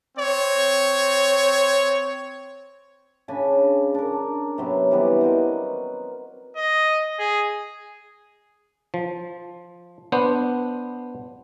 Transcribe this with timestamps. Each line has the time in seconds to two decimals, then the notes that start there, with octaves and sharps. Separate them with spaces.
0.17 C4 C#5
3.28 C#3 D4 G#5 B5
3.94 D4 A#4
4.58 C3 F#3 B3
4.91 E3 G3 B3
5.21 F#4 A#4 C5 D#5
6.56 D#5
7.19 G#4
8.94 F3
10.12 B3 D4 C5